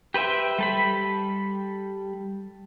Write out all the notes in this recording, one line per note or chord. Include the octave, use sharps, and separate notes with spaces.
G4 B4 C5 E5 G5
G3 A4 B5